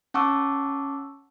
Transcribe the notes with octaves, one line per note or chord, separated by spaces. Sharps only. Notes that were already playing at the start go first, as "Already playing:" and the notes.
C#4 F#5 A5 C#6 D6 E6